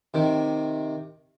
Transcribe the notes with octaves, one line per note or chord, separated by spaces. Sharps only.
C3 D#3